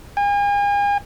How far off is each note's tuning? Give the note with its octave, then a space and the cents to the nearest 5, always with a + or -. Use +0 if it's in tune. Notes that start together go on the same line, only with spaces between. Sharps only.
G#5 -40